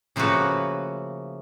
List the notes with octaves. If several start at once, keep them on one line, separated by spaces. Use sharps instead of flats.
C#3 F3 A3 A#3 F#4 B4